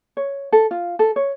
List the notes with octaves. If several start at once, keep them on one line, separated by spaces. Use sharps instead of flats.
C#5
A4
F4
A4
C#5